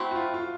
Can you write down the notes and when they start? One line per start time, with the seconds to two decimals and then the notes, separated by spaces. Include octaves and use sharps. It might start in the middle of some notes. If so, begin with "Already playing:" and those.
Already playing: A3 C4 E4 F#4
0.11 F#4
0.16 F4
0.34 F4